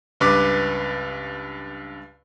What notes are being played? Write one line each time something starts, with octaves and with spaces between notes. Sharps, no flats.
C#2 G2 B4 D6